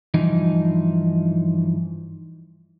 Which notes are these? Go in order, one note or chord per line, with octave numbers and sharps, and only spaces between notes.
G2 E3 F3 D#4